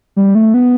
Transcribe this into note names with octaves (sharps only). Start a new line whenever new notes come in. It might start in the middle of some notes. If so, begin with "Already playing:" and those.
G3
A3
B3